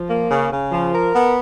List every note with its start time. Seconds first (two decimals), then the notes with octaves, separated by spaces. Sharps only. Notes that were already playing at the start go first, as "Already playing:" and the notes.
Already playing: F3
0.09 A#3
0.30 C#3
0.51 C#3
0.72 F3
0.93 A#4
1.14 B3